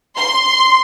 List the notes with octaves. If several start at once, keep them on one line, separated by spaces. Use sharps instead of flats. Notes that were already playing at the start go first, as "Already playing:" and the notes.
C6